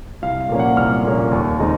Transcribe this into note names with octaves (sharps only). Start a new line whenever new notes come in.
C2 F5
F5
A#2 F3 A#3 C#4
F#5
C2 F6
A#2 F3 A#3 C#4
D#2
D#3 G#3 C4 D#4